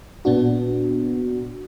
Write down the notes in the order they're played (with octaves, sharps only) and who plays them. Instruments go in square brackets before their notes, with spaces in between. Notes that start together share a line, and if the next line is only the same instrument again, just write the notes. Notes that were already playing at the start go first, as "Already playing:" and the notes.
[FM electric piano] A#2 B3 D4 F#4